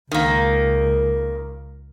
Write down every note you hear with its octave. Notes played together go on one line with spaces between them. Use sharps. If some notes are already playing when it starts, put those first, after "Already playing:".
C#2 D#3 A#3